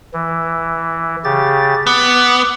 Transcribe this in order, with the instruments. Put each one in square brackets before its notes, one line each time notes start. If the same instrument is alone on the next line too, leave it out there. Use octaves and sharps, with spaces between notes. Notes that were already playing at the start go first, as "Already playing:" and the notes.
[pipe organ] E3
C#3 G4 A6
[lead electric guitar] B3 [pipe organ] D6